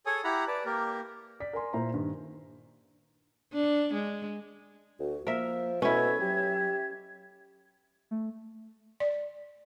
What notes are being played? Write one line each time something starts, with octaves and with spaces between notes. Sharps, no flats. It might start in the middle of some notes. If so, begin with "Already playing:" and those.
G#4 A4 C#5 G#5 D#6
E4 G4 F#5 A#5 B5
B4 D5 A5
A#3 G4 A#4
D5 B6
A#4 D5 G#5 C6
A#2 A#3 E4 C5 A#5
G2 D#3
D4
G#3
D2 F#4
F3 A#3 A#4 E5
B2 C#4 E4 A4 E5 G#6
F#3 G4
A3
D5